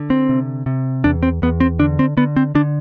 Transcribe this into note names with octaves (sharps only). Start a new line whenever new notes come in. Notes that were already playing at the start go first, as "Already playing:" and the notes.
Already playing: D3
C4
C3
C3
E2 D4
C4
E2 B3
C4
D3 D4
C4
D3 B3
C4
D3 D4